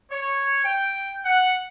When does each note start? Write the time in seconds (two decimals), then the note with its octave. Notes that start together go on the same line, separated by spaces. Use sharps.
0.10 C#5
0.64 G5
1.25 F#5